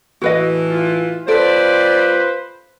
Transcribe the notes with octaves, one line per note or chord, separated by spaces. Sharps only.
A2 E3 F#4 B4 D#5
F4
G3 C4 F4 A4 B4 C5 D5